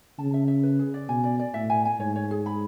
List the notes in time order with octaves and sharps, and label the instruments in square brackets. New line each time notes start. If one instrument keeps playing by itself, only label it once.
[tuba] C#3 [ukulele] A5
[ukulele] E5
E5
B4
G#4
D5
[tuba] B2 [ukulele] G#5
[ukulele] D5
D5
[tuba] A2 [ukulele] E5
[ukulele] G#5
G#5
[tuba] G#2 [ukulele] C#5
[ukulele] C#5
G#4
B5